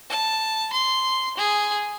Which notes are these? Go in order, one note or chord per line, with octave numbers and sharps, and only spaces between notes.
A5
C6
G#4